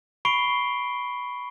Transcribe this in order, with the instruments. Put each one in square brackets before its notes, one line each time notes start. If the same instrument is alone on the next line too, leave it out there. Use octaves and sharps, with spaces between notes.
[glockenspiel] B5 C#6 C7 D7 G7